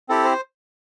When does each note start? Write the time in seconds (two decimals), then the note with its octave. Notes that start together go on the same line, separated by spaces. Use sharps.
0.09 C4 E4 G4 A4
0.25 C5